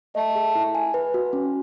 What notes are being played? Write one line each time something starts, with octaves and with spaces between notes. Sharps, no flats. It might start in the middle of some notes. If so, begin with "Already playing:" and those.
A3 D#5
G#4
E4
G#5
B4
F#4
C#4